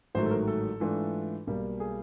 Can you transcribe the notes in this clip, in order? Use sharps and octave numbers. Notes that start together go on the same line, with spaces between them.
A1 G#2 D#3 F#3 A3 C5
A4
A#4
A4
G#2 E3 A3 D4 F4
B1 B2 G3 A#3
G#4